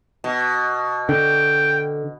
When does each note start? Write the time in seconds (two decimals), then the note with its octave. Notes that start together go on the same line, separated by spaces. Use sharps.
0.24 B2
1.09 D3 G5